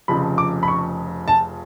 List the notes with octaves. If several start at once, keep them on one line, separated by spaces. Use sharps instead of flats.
F1 F2 C#3 F3 B5
D6
B5
C#6
A5